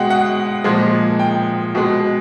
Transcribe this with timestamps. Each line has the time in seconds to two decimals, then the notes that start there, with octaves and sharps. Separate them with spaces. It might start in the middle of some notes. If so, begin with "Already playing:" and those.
Already playing: B2 G#3 F#5 G5
0.10 F#5
0.64 A#2 F3 G#3
1.19 G5
1.75 B2 G#3